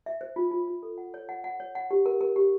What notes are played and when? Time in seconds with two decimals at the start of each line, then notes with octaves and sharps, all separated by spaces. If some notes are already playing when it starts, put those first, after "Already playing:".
0.06 E5
0.21 C5
0.36 F4
0.51 F4
0.68 F4
0.83 A4
0.98 F#5
1.14 C#5
1.29 F#5
1.44 F#5
1.60 C#5
1.75 F#5
1.91 G4
2.06 A#4
2.21 A#4
2.36 G4